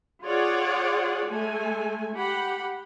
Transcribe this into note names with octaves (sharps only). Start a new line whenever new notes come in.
F4 G#4 C#5 D5 F#5
G#3 A3 G#5
G4 F#5 B5